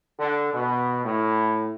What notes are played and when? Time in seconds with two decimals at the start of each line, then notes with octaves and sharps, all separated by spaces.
0.19 D3
0.53 B2
1.05 A2